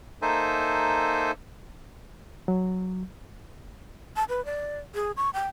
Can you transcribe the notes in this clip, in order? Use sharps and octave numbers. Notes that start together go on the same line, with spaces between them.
A#3 D#4 A4 C5 E5 G#5
F#3
A5
B4
D5
G#4
C#6
G5